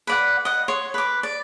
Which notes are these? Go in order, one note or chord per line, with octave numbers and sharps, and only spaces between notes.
B4 D5 F#5
D#5 F#5
C#5 C6
B4 D6
D5